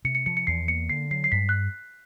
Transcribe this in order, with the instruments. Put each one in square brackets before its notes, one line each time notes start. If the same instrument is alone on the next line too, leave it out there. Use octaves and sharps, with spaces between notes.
[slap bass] C3 [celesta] C#7
[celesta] C#7
[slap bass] F3 [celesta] C#7
[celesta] C#7
[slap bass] E2 [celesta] C7
[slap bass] A#3 [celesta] C#7
[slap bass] D3 [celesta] C7
[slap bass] F#3 [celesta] C7
[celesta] C7
[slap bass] G2 [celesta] B6
[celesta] F#6